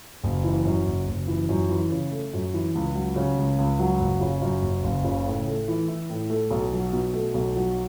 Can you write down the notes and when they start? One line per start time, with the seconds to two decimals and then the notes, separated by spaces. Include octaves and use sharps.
0.24 F#1
0.44 E3
0.65 F#2
0.87 F#1
1.08 F#1
1.28 E3
1.49 F#2
1.69 E3
1.90 C#3
2.11 A3
2.33 F#2
2.54 E3
2.75 C#2
2.95 F#3
3.16 C#3
3.38 C#2
3.58 C#2
3.79 F#3
4.00 F#1
4.21 C#3
4.42 F#2
4.62 F#1
4.84 F#1
5.04 C#3
5.26 A2
5.47 A3
5.68 E3
5.88 E4
6.10 A2
6.30 A3
6.51 B1
6.73 F#3
6.93 B2
7.14 A3
7.34 B1
7.56 F#3